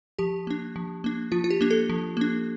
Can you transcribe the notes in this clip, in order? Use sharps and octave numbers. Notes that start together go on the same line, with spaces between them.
F3 G4
A#3 D4
F3
A#3 D4
F3 F4
F4
G4
A#3 D4
A4
F3
A#3 D4